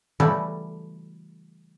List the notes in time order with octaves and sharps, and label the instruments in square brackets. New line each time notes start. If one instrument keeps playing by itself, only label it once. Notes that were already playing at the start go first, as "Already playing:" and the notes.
[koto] C#3 E3 F#3 G3 A3